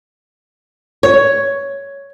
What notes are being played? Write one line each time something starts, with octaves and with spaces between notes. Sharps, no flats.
C#5